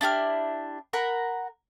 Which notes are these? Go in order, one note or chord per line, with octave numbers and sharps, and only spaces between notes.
D4 E4 G4 F6
A#4 F#5 A#5 B5